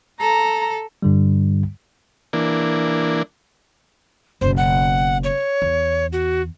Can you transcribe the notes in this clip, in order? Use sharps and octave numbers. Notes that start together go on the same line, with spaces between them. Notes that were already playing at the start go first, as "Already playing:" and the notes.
A4 A#5
G2 D3 G3
E3 A#3 D4
F#1 B2 C5
F#5
C#5
E2
F#4